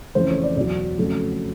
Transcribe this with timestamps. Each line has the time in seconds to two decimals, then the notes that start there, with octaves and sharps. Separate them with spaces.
0.15 F2 C#3 E3 A3 C5
0.29 C#5
0.43 D5
0.57 E2 B2 F#3 D5
0.98 F2 C#3 F#3 A3